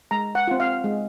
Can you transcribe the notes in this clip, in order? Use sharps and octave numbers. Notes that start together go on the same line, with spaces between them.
G#3 A#5
F#5
C4 F4
F5
G#3